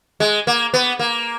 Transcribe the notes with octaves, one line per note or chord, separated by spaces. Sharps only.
G#3
A#3
B3
A#3